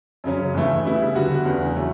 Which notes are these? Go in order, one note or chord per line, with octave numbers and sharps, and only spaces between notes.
F#2 C#3 F#3 C#4
G2 E3 A3 E4
C#3 G3 B3 E4
D3 G3 B3 F#4
E2 C#3 E3
F#3 A3 C#4